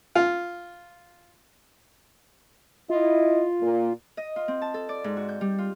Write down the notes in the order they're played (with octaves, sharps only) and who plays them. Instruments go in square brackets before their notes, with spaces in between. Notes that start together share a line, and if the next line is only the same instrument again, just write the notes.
[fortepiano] F4
[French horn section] E4 D#5 [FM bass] F4
[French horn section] A#2
[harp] D#5
F4
C4
A5
A4
D5
G#2
F#4
G6
G3
F4